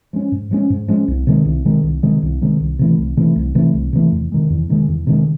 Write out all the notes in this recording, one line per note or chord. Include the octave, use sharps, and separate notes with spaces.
F3 G#3 C#4
G#2
F3 G#3 C#4
G#2
F3 G#3 C#4
C2
C3 D#3 G#3
C2
C3 D#3 G#3
C2
C3 D#3 G#3
C2
C3 D#3 G#3
C2
C3 E3 A3
C2
C3 E3 A3
C2
C3 E3 A3
C2
C3 E3 A3
E2
C3 D#3 G#3
E2
C3 D#3 G#3
E2
C3 D#3 G#3